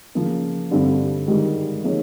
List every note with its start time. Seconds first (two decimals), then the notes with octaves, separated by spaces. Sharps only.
0.15 C#3 F3 A#3
0.71 G2 D3 G3 C4
1.28 G#2 D#3 G3
1.84 F3 A#3 D#4 G#4 C#5